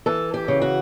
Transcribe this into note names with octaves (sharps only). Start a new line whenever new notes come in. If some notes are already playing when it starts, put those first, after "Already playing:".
E3 A4
G4
C#3
F#4